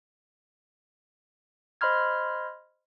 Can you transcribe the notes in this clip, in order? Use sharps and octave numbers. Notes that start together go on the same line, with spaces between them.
C5 D#5 B5 C6 F6 G#6